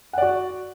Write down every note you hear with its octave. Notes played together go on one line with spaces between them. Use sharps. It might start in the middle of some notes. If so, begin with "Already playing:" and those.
F#4 D5 F#5